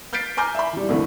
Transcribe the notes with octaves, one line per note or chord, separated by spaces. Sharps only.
F6 G6 A6 B6 C7 D7
G#5 A#5 D6 F6 G6
E5 B5
E3 G3
C2 F2 D3 E3 A3